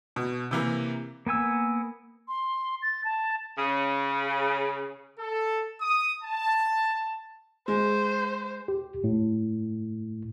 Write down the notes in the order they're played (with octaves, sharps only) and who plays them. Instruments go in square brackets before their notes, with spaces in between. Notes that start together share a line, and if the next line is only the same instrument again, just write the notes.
[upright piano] B2
C3 E3 A#3
[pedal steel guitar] A#3 B3 G#5 E6
[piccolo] C6
A6
A5
[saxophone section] C#3
[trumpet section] A4
D#6
A5
[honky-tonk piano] G#3 [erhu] C5
[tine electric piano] G4
A2